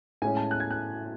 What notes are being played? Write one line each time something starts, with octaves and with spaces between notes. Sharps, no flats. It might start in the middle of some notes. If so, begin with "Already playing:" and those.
A2 G#3 C#4 G#5
A5
F#6
G#6
F#6